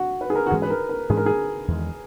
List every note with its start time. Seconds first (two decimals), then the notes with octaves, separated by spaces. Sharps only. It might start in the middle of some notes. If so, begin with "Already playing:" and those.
Already playing: F#4
0.21 B4
0.30 G#4
0.36 A#4
0.47 F#4
0.51 G#2 E3 G#3 C#4 G#4
0.62 B4
0.70 A#4
0.89 A#4
1.09 G#2 E3 G#3 C#4 G#4
1.17 A#4
1.26 G#4
1.68 E2 D#3 G#3